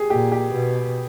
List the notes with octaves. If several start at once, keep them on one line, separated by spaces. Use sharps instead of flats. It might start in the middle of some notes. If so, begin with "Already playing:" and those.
Already playing: G4 G#4
A#2 G4
G4
B2